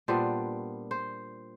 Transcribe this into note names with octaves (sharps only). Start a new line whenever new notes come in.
A#2 G3 B3 D4 C5
C5